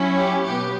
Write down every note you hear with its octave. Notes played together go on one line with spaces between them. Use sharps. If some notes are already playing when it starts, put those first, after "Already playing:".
Already playing: F#3 C#4 E4
G4
B2 F#3 B3 G4